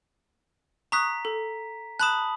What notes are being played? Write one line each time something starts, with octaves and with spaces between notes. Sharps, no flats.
A#5 C#6 D#6 F#6 B6
A4
A5 B5 D#6 F#6 E7